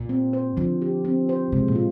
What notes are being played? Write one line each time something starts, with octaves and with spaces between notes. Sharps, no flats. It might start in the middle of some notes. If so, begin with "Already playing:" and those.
Already playing: A#2
C4
C5
D3 F3
G4
C4
C5
C3 G#3
A#2
F4